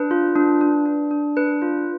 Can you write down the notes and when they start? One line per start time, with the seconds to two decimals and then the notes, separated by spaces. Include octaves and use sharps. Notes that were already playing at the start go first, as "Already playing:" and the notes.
Already playing: D4 B4
0.11 F4
0.36 D4
0.61 D4
0.86 D4
1.11 D4
1.36 D4 B4
1.62 F4